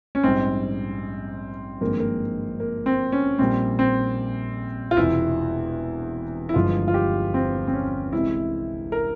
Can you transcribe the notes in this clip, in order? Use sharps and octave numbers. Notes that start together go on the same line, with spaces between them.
C#4
A#1 G#2 G3 C4
G#1 G2 F3 G#3 A#3
A#3
A#3
C4
C#4
A#1 A#2 G3 C4
C4
F4
E1 E2 C3 E4
E4
G1 G2 F3 G#3 F4
F4
G4
C4
C4
C#4
C2 C3 E3 G#3 E4
A#4